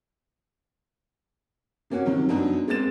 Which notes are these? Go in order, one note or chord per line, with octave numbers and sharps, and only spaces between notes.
C3 A#3 C#4 F#4
C3 D#3 F#3 G3
F#2 F#3 B3 D4 D#4
G#3 A#3 C4 A6 E7